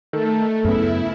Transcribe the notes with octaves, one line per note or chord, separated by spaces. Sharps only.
D#3 A3 A4
F#2 C#3 B3 E4